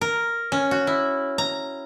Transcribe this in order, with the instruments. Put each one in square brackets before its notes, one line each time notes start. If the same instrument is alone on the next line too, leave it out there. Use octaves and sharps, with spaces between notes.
[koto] A#4
C#4
F#4
E4
A#5